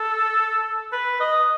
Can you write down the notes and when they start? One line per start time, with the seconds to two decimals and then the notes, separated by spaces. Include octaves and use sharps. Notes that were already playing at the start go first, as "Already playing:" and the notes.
Already playing: A4
0.93 B4
1.20 D#5